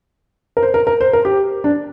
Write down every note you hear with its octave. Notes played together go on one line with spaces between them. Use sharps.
A#4
C5
A#4
A#4
C5
A#4
G4
D4